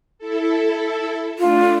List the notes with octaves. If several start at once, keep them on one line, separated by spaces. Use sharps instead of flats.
E4 A4
A3 D4 F4